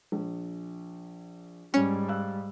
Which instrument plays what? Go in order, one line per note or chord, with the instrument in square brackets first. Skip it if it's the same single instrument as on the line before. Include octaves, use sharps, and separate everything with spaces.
[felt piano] A#1
[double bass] G#2 G3 [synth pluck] C#4
[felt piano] F5 E6 F#6